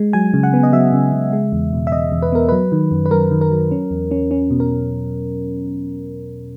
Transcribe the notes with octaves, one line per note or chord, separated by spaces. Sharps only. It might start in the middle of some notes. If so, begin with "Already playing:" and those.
Already playing: G#3
F#3 G#5
C#3
F#5
B3
D#5
F#3 E5
C#3
C#3
G#3
E2
B2
E5
E2 D#5
E2
B4
B3 A#4
F#3 B4
D#3
F#2
B4
F#2 A#4
D#3
A#4
F#3
C#4
E2
C#4
C#4
B2
A#4